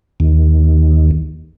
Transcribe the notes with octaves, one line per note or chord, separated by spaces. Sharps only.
D#2